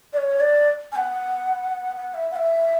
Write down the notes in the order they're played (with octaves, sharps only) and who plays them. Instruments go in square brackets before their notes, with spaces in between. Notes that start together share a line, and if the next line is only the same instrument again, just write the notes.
[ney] D5
C#5
D5
G#5
F#5
F#5
E5
F#5
E5